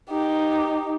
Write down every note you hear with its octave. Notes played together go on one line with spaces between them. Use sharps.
D#4 G4